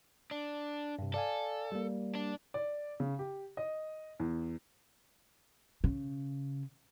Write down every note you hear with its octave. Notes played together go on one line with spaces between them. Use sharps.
D4
G2 C3
A4 D5 F5 G#5
G3 A#3
D4
D5
C#3
G4
D#5
E2
C#3